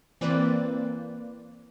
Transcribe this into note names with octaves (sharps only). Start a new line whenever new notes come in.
E3 A#3 C4 B4 C5 D5